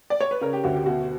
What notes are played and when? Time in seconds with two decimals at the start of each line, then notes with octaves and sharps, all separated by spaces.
0.10 D5
0.21 C#5
0.31 B4
0.41 C#3 A#4
0.53 G4
0.64 D2 F#4
0.75 G4
0.86 B2 F#4